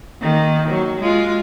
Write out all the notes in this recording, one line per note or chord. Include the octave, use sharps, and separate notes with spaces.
D#3 A#3
F#3
G#3 F4